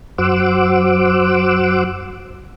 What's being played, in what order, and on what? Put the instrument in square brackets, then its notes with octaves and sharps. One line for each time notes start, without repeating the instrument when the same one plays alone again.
[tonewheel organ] F#2 F#4 C5 F#5 D6 E6